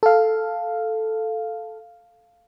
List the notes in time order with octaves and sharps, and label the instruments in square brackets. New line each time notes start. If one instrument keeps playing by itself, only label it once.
[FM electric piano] A4 F5